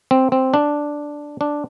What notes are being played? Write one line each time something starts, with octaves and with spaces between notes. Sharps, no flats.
C4
C4
D4
D4